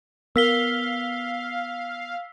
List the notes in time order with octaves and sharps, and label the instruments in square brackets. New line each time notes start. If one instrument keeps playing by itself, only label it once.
[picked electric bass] B3 [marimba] A#4 [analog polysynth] F5 [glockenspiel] E6 B6 G7